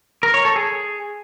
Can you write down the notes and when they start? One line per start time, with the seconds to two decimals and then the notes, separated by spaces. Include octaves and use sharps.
0.23 A#4
0.34 C#5
0.45 A4
0.56 G#4